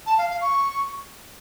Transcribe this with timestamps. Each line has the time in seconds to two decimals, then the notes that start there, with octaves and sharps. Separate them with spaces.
0.06 A5
0.18 F5
0.30 F5
0.42 C#6